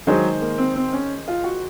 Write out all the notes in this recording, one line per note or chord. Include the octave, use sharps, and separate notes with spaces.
D#3 F#3 G#3 D#4 G#4 C5
A#3
C4
C4
C#4
F4
F#4